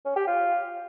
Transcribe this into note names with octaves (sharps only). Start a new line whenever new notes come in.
C#4
G4
F4